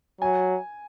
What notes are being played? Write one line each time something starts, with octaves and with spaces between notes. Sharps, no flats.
F#3 G#5